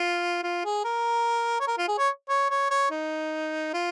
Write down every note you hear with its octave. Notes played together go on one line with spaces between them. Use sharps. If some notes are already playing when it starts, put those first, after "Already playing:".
Already playing: F4
F4
G#4
A#4
C#5
A#4
F4
G#4
C#5
C#5
C#5
C#5
D#4
F4